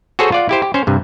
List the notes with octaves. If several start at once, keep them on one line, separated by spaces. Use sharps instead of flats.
F#4 G#4 A4 C5 C#5
F4 D5 F#5
E4 G4 C5
G4
C#4 C5
G2 C3